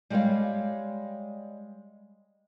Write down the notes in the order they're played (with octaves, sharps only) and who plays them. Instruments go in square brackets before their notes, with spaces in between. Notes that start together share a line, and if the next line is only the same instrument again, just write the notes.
[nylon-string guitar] G3 G#3 G4 B4 C#5 F5